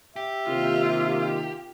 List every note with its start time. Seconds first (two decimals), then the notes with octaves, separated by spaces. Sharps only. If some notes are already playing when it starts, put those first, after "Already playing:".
0.16 G4 E5
0.48 C3 D#3 A#3 F4